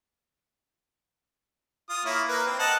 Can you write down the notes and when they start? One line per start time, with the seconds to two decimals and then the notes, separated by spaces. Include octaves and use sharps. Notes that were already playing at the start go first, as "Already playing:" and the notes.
1.90 F4 D#6
2.05 A#3 E4 C#5
2.28 A#3 A#4 B4
2.47 C4
2.59 D#5 F#5 A5